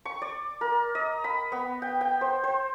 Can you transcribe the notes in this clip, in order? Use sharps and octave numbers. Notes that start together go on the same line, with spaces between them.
C#6
D5
A#4
D#5
B5
B3
G5
G5
C5
C5